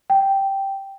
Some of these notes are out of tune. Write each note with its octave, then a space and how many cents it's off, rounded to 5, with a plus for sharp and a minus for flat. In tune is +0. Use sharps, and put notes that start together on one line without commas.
G5 -5